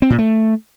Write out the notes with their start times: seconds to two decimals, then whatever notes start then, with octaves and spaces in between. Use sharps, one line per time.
0.02 C4
0.10 A#2
0.19 A3